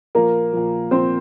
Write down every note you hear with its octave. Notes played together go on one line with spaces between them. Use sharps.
A#2 F3 A#3 A#4
A#2 F3
A#2 F3 C4 C5